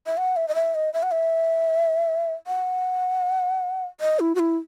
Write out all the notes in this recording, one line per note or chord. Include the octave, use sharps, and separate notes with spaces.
E5
F#5
E5
D#5
E5
D#5
E5
F#5
E5
F#5
D#5
E4
F#4
E4